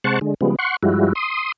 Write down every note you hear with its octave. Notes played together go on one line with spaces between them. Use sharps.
C3 G#3 C5 F#5 A5 C#6
D3 G#3
C#3 F3 G3 G#3 B3
F#5 C6 C#6
G2 F3 G3 G#3 E4 F#4
C6 D#6